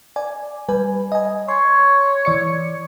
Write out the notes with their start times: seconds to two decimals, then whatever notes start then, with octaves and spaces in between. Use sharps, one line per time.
0.16 D5 G#5
0.69 G3 B4 G#5
1.12 D#5 G#5
1.48 C#5 C6
2.25 E3 D5 C#7